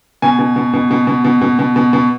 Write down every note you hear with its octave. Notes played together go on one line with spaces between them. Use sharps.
B2 G#5
B2
B2
B2
B2
B2
B2
B2
B2
B2
B2